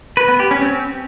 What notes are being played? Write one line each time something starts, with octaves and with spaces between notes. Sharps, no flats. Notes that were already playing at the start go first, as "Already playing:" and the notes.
B4
B3
G4
C#4
C4